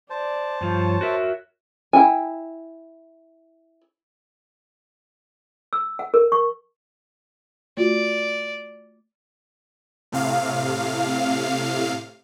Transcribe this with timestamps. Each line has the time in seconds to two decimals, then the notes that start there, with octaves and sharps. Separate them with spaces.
0.10 C5 D5 A5
0.61 G2 F3 C#5
1.01 F#4 A#4 E5
1.93 E4 G5 G#5
5.73 E6
5.99 F#5
6.14 A#4
6.32 C#6
7.77 A3 F4 F#4 D5
10.12 A2 C3 F5